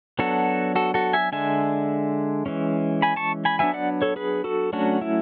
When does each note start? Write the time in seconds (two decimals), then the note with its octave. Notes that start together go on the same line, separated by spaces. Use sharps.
0.19 F#3 B3 D4 F#4 A4
0.76 F#4 A4
0.94 F#4 A4
1.13 E5 G#5
1.32 D3 G#3 D4 E5 G#5
2.46 E3 G#3 C#4
3.02 G#5 B5
3.16 A5 C#6
3.45 G#5 B5
3.59 F#3 B3 D4 E5 G#5
3.74 D5 F#5
4.02 A4 C#5
4.16 G#4 B4
4.44 F#4 A4
4.73 F#3 A3 C#4 D4 F#4
5.01 E4